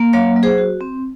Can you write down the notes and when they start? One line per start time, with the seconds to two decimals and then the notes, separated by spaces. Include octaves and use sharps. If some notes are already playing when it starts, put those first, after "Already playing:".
Already playing: A#3
0.13 F#3 C#5 F5
0.36 F#3
0.43 G#4 C5
0.58 F#4
0.81 C4